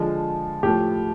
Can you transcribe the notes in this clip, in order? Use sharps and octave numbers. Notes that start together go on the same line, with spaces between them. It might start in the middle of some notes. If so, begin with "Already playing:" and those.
Already playing: D3 F3 G#3
A2 F3 A3 G4